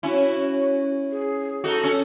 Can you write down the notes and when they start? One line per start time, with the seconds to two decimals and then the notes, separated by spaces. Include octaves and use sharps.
0.03 C#4 E4 F#4
1.11 G#4
1.64 D#4 F#4 A4
1.84 C#4